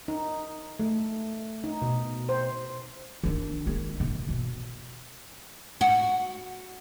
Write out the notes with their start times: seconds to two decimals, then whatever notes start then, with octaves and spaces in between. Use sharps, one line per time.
0.08 D#4
0.80 A3
1.64 D#4
1.82 B2
2.29 C5
3.24 D#3 D4
3.67 D#3 G#3
4.00 C3
4.29 B2
5.81 F#4